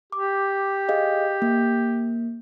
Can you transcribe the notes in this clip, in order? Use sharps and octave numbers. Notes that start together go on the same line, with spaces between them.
G4 D6
G#4 D#5 F5
A#3